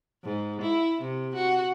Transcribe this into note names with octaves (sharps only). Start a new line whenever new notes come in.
G#2
E4
C3
F#4